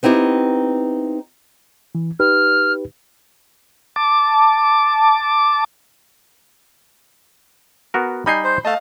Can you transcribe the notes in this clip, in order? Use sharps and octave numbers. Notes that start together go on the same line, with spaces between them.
B3 C4 D#4 E4 G4
E3
D#4 G4 B4 F6
A5 D6
B3 F#4 A#4
G3 D#4 G#5 B5 G6 C7
C5
A3 D#5 F5 A5